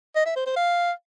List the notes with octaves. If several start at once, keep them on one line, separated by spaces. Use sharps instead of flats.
D#5
E5
C5
C5
F5